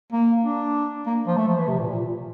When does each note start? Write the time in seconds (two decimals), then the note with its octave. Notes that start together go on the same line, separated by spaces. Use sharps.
0.12 A#3
0.44 D4
1.06 A#3
1.27 F3
1.37 A3
1.47 F3
1.58 E3
1.68 C3
1.79 A#2
1.90 A#2